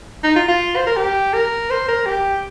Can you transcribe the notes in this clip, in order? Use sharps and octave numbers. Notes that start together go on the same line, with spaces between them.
D#4
F4
F4
C5
A#4
G4
A#4
C5
A#4
G4